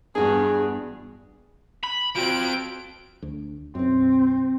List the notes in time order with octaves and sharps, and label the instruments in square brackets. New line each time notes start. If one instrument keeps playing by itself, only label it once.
[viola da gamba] E2 G2 [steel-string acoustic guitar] D4 F#4 [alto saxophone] G#4
[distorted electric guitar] B5
[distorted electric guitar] F3 C4 [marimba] F#4 [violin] D7
[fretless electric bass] D2
[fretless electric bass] B1 F#2 [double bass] C4